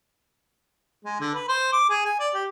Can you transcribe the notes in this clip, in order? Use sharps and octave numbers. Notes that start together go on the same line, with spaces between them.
G#3
D3
B4
C5
D6
G#4
G#5
D5
G4